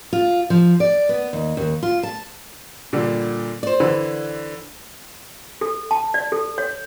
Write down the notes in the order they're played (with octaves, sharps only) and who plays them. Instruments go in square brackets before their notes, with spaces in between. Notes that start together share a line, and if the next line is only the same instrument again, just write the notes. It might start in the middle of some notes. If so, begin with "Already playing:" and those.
[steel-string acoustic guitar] F4
F3
D5
B3
D#2
D#2
F4
A5
[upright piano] A#2 D3 G3
[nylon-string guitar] C5 D5
[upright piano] D3 E3 B4
[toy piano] A4
A5
D5
A4
C#5